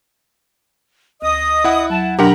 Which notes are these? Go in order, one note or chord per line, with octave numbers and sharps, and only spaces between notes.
D2 D#5 D#6
E4 F#5
F#3 A5
B2 F#3 D4 G4 A#4 F#5 A#5 B5